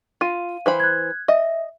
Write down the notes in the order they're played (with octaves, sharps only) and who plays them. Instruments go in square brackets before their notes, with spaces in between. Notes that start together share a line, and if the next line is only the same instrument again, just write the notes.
[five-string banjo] F4 [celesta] F5 D#7
[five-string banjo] E3 C5 B5
[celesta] F#6 G#6
[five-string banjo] D#5 [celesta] E5